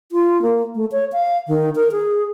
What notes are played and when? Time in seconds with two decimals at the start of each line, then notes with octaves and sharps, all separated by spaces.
0.12 F4
0.42 A#3
0.75 A3
0.92 C#5
1.13 F5
1.48 D#3
1.75 A#4
1.92 G#4